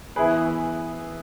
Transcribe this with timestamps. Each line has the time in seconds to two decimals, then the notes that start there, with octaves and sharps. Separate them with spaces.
0.16 E3 B3 E4 G#4 B4